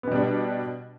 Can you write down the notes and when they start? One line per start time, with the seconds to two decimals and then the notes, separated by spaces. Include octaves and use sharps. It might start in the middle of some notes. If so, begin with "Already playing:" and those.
0.03 B3
0.07 B2
0.11 G3
0.16 D4